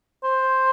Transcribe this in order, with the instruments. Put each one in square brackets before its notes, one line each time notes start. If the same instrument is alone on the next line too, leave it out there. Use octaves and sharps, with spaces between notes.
[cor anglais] C5